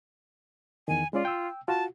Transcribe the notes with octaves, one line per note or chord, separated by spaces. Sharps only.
E2 D#3 G#5
G#3 C#4 F4 D5
G5 E6
F4 F#4 A5